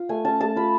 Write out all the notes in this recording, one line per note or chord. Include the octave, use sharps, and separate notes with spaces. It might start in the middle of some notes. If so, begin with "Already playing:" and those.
Already playing: F4
A3 G#5
C#4 A5
A3 A5
F4 B5